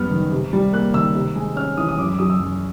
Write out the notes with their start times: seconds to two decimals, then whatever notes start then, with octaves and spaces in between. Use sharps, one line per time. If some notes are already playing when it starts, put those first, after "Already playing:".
Already playing: F#2 F#3 G3 B3 F6
0.11 D#3
0.32 C3
0.53 G3
0.73 A#3 F#6
0.94 D#3 E6
1.15 C3
1.36 G#3
1.56 C#4 F6
1.77 E3 D#6
1.88 D#6
1.98 F#2 D6
2.09 D6
2.19 F#3 D#6
2.30 E6
2.40 F#2